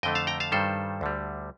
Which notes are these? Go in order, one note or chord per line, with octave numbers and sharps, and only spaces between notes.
F2 D3 A3 D#5 G5
F5 A5
G5 A#5
F5 A5
G2 D#3 G3 A4 C5
D2 D3 G3